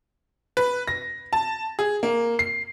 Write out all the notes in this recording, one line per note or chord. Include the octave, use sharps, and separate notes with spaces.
B4
A#6
A5
G#4
A#3
C7